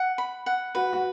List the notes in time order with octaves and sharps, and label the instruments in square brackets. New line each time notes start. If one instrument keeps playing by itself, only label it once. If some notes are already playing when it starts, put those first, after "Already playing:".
Already playing: [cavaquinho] F#5
B5
F#5
[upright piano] F#4 [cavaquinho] B4
[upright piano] F#4